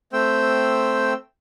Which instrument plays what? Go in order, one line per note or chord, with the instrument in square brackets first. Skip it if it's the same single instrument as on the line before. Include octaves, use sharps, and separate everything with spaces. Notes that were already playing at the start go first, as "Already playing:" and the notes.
[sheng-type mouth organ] A3 C4 C5 G5 E6